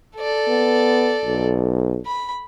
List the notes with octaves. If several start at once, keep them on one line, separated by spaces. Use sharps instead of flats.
A4 D5
B3
B1
B5